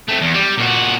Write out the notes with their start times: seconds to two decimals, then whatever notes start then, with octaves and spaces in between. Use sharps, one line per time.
0.08 A3 C4
0.21 E2
0.34 G3
0.58 A#2 F#4